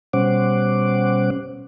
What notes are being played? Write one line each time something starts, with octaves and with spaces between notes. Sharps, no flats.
B2 G3 C#4 C5 F#5 D6